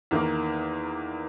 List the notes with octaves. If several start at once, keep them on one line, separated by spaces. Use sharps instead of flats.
E2 D#3 A#3